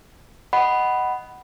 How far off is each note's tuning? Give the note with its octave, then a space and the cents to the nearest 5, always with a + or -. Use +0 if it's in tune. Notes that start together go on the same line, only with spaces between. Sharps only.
D#5 +0 F#5 +15 B5 +0